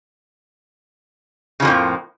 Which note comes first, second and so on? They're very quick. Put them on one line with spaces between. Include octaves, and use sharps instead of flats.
C#3 F3 F2 A2 A#3